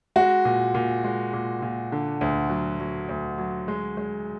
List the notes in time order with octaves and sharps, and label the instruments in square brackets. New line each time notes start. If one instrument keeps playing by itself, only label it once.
[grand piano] G#3 [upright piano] F#4
[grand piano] A#2
A#2
G#3
A#2
A#2
D3
D2
F#3
F#3
D2
F#3
G#3
G#3